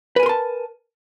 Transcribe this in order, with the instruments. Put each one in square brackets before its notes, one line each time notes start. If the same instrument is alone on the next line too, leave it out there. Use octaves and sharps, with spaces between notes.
[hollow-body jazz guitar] B4
G#5
A#4
C6
A5